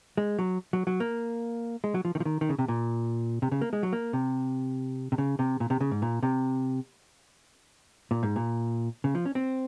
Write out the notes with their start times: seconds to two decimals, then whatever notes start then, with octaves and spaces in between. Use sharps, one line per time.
0.18 G#3
0.39 F#3
0.73 F#3
0.87 F#3
1.00 A#3
1.84 G#3
1.94 F#3
2.05 F3
2.15 D#3
2.20 F3
2.25 D#3
2.41 D#3
2.49 C#3
2.59 C3
2.68 A#2
3.42 C3
3.52 C#3
3.61 A#3
3.73 G#3
3.83 F#3
3.93 A#3
4.13 C3
5.12 C3
5.18 C#3
5.39 C3
5.60 A#2
5.70 C3
5.80 C#3
5.91 G#2
6.02 A#2
6.23 C3
8.11 A#2
8.23 G#2
8.36 A#2
9.04 C#3
9.15 F3
9.26 C#4
9.35 C4